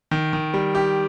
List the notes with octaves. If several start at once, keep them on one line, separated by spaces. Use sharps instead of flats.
D#3
D#3
G3
G4